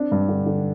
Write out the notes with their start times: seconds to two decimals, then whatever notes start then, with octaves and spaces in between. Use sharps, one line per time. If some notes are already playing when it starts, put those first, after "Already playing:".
Already playing: C4 D4
0.12 G2
0.29 D3
0.46 D3